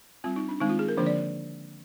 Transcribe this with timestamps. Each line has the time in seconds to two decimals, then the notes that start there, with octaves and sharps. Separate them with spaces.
0.24 G3 C4 F4
0.36 D#4
0.49 D4
0.61 D#3 G#3 C4 D#4
0.69 F4
0.79 G#4
0.88 A#4
0.97 D3 F3 A#3 D4 C5
1.06 D5